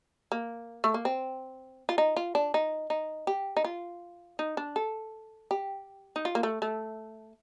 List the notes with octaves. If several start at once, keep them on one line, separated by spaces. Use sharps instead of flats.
A#3
A3
A#3
C4
F4
D#4
F4
D4
D#4
D#4
G4
D#4
F4
D#4
D4
A4
G4
D#4
F4
A#3
A3
A3